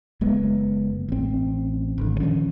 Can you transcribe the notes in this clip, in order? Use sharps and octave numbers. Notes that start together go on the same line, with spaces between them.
F#1 G#3 B3
A1 C4
G#1 D3
A#2 D#3 F3 C#4